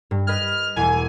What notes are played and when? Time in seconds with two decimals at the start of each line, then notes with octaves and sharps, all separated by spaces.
0.11 G2
0.27 B4 D#5 F6 G#6
0.76 E1 E2 G#5